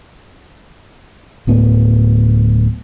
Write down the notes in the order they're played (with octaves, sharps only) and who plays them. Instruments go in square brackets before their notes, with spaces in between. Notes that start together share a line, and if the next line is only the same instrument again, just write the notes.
[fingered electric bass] D1 A2 B3